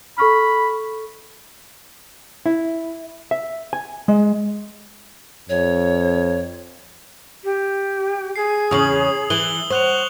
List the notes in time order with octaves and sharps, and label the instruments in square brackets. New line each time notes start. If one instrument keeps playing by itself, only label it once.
[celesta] A4 C#6 F6 [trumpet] B5
[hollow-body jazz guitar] E4
E5
G#5
G#3
[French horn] F2 [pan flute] C#5
[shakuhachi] G4
[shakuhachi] G#4 [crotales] C7
[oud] E2 C#3 [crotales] D#6 F#7
[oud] E3 [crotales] F#7 G7
[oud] C5 [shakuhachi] F#5 [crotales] C#6 F#6 F7